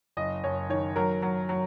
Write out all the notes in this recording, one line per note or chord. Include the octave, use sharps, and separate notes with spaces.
F#1 D#5
F#1 C#5
D#3 C#5
F#3 A#4
F#3
F#3